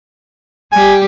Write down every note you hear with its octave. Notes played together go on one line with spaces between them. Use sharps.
G3 G4 G#5